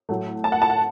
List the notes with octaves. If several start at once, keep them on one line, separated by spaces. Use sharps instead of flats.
A2 F#3 A3
A5
F#5
A5
F#5